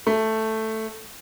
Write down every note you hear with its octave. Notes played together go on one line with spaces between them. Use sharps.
A3